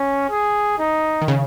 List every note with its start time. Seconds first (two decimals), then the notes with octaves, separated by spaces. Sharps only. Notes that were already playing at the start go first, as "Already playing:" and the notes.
Already playing: C#4
0.30 G#4
0.79 D#4
1.22 D#3
1.28 C#3